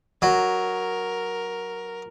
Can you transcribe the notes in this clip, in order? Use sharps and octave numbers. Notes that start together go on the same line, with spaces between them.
F#3 A#4